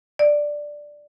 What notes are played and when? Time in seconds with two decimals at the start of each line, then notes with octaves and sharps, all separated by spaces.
0.19 D5